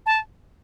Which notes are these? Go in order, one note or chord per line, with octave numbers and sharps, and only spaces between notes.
A5